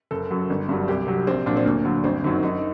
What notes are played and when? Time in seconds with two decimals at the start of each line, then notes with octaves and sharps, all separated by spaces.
0.11 F#1 A4
0.30 F#2 F#3
0.50 G1
0.69 G2 F#3
0.88 C2 G4
1.07 C3 F#3
1.27 A#1 C4
1.46 A#2 F#3 D4
1.57 C4
1.65 D2 A#3
1.85 D3 F#3
2.04 G1 C4
2.24 F#2 D#3 F#3
2.43 F#2 D#4